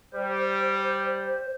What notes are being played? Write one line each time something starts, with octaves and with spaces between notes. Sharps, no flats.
G3 C5